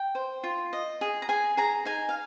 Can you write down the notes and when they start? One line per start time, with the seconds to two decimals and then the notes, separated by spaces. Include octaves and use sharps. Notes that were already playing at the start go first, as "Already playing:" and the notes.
Already playing: G5
0.15 C5
0.44 F4
0.73 D#5
1.01 G#4
1.22 A#5
1.29 G#4 G#5
1.57 G#4 A#5
1.85 D#4 G#5
2.09 F5